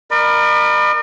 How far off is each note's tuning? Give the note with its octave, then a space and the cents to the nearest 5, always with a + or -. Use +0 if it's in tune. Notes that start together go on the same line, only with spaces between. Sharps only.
A#4 +5 D5 +45 B5 +0